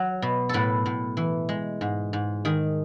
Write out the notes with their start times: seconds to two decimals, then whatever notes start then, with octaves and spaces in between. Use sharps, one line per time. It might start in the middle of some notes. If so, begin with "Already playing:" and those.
Already playing: F#3
0.22 B2
0.49 A2 A4 B4
0.86 A2
1.17 E3
1.49 G#3
1.81 G#2
2.13 G#2
2.45 D#3 G#4